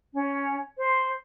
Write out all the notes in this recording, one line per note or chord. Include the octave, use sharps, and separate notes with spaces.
C#4
C5